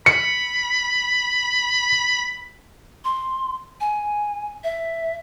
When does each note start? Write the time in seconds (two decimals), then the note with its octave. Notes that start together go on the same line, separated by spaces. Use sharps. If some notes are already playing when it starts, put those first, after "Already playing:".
0.06 B5 C#7
3.05 C6
3.80 G#5
4.64 E5